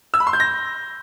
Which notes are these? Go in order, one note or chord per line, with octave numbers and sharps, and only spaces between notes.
E6
B5
C6
G6
A#6